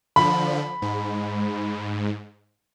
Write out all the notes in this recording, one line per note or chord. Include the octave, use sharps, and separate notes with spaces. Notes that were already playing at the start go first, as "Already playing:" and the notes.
D3 F3 B5
G#2